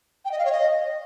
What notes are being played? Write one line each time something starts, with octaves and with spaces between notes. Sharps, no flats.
G5
D#5
F5
C#5
D#5